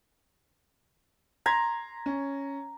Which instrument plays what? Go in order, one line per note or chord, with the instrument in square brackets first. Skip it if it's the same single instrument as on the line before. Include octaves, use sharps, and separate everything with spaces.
[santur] A#5 [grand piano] C6 G#6 B6
[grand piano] C#4